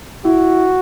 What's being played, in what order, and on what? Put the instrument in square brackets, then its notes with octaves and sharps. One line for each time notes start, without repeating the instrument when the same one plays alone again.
[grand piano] E4 [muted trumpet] F#4